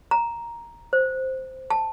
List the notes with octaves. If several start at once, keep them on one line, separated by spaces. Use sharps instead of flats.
A#5
C5
A5